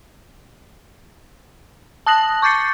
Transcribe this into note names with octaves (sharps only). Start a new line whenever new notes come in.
A5 D#6 F#6 A#6 F#7
C#6 D6 G6 A6 C7 C#7